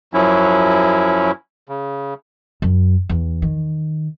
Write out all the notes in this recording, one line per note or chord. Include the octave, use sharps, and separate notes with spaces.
F#2 F3 F#3 C#4 E4
C#3
F#2
E2
D#3